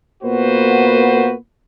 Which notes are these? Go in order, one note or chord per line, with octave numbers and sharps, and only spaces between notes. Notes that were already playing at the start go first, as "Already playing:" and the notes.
A#2 A#3 B3 F#4 B4 C5